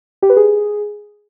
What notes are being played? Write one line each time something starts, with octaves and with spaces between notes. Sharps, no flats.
G4
B4
G#4